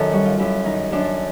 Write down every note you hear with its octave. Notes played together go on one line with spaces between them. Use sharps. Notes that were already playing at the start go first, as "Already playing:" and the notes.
Already playing: F#2 D#3 A4
G3 F#4
F4
F#2 E4
D#3 D#4
F#2 D4